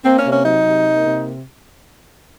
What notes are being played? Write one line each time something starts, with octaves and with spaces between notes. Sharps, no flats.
A#3 C4
C#4
C3
C#4
F#3 D#4
C3
A#3
C3